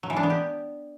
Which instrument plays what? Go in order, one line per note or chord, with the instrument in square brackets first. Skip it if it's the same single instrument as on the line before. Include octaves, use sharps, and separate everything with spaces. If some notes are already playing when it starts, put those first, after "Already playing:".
[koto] F#3
E3
D4
B3
G4